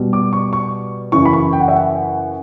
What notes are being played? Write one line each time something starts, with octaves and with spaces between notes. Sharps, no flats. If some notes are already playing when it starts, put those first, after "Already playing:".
Already playing: B2 G3
D6
C#6
C#6
F#2 C#3 E3 C#6
B5
C#6
G5
F#5
E5
F#5